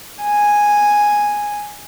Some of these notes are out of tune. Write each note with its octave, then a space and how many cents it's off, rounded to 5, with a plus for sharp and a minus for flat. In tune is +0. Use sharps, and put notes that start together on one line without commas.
G#5 -5